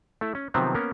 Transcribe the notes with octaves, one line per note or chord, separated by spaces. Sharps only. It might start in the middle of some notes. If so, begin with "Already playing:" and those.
A3 E4
C#4
C3 D#3 F3 F#3 B3 C4
A#3 B3 C#4 A#4